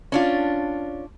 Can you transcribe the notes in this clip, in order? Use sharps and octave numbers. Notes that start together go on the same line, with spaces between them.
C#4 D4 F4